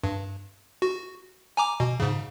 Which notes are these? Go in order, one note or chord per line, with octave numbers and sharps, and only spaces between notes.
G2
F#4
G#5 A#5 D6
B2
G#2 C#3